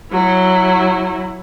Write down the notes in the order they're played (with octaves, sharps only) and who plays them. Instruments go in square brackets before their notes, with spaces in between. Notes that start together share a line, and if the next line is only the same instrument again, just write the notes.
[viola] F#3 E4